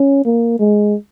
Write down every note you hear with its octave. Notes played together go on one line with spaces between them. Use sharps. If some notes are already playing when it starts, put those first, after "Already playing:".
Already playing: C#4
A#3
G#3